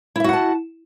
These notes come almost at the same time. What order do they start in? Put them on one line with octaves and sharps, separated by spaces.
E4 E5 F#4 F#5 A5